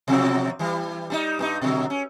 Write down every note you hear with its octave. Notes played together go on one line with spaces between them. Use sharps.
B2 F3 F#3
E3 G3
G3 C#4 D#4
G2 C4 D#4
B2 D3 F#3
C#4